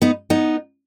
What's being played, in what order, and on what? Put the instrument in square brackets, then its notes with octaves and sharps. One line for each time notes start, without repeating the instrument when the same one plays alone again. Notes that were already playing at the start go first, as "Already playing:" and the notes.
[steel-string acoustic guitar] B3 D#4
B3 D#4